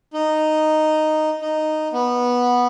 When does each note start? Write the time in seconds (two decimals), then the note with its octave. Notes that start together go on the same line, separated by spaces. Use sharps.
0.14 D#4
1.42 D#4
1.93 B3